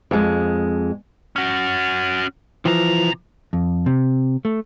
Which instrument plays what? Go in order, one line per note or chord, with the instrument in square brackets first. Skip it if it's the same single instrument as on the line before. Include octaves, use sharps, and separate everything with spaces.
[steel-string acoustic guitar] F2 G#3
[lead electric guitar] C#4 F#4
[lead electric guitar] C3 A#5 [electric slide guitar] E3 F3
[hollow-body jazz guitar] F2
C3
A3